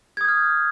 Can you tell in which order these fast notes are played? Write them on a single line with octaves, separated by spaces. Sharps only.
G#6 D#6 G6 F6